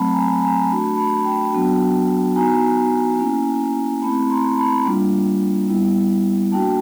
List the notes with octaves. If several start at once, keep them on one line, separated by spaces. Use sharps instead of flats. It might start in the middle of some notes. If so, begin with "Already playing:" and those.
Already playing: F#3 A3 C4 A5 B5
G#5 A#5
G#5 A#5
A3 D4 F#4 A5 B5
A5 B5
G5 A5
F#3 B3 D4 F#4
B3 D#4 F#4 G#5 A#5
A#3 C#4 E4
A3 C4 E4 A5 B5
A#5 C6
A5 B5
G3 A#3 D4 F4
G3 B3 E4
A#3 D4 F#4 G5 A5